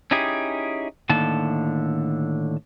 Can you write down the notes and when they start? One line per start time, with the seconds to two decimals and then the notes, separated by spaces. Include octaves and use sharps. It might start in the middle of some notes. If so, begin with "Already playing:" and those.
0.11 C#4 D#4 E4 G4 G#4
1.09 A2 D3 D#3 A#3 A5